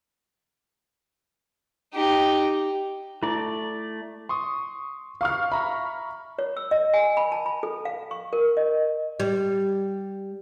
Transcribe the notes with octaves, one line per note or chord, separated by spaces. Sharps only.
D#4 G4
A3 E4 D5
C6 C#6 D#6
F5 C#6 F6
E5 A#5 B5 C#6
C#5
E6
D#5
G#5
B5
A5
B5
A4
F5
C#6
A#4
D#5
G3